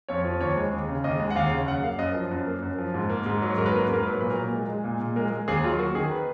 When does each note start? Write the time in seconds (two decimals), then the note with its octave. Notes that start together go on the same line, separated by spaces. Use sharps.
0.09 F2 C#5
0.24 F3
0.41 D#2 C#5
0.57 G#3
0.73 D#2
0.88 C#3
1.04 D#2 D#5
1.20 G#3
1.30 F#5
1.35 D#2 F5
1.51 C#3
1.67 F#2 F#5
1.83 A#3 F5
1.99 F#2 D#5
2.15 F3
2.31 F#2
2.47 A#3
2.63 F#2
2.79 F3
2.94 G#2
3.10 A#3
3.26 G#2
3.42 F#3
3.58 G#2 A#4
3.66 B4
3.73 A#3 A#4
3.84 B4
3.89 G#2 A#4
4.03 F#3 B4
4.11 A#4
4.21 A#2 B4
4.30 A#4
4.36 A#2
4.53 G#3
4.69 G#3
4.84 A#2
5.01 A#2
5.16 G#3 A#4
5.31 G#3
5.48 D#2 G#4
5.63 F#3 F4
5.79 A#3 F#4
5.95 D#3 G#4
6.11 B4